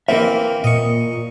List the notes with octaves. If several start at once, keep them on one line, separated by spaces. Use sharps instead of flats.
E3 A#3 C4 A#4 E5
A#2 D#5 C#6